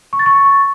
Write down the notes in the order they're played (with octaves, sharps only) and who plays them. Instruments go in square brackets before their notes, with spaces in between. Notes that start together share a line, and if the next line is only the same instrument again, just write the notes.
[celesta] C#6
A6
C#6